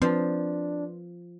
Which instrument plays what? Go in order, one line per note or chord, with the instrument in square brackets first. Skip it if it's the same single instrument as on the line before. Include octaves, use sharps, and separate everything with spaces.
[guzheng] F3 [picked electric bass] C4 [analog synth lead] D4 [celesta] B4 C6